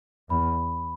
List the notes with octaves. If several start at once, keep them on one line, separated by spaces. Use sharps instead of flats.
E2 B5